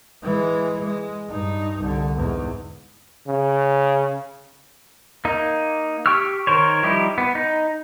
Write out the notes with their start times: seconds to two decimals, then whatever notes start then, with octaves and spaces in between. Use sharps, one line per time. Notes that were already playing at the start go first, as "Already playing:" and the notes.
0.23 E3 G#3
0.84 G#3
1.28 G2 D#4
1.80 C2 D3
2.16 E2 G#2
3.28 C#3
5.25 A#3 D#4
6.06 G4 G5 C#6 E6 F6
6.47 D#3 A#4 C5 C#5
6.83 F3 G3 D#4 E4 G4
7.18 B3
7.35 D#4